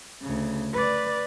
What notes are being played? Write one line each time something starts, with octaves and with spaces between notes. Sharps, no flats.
D2 C#3
B4 D5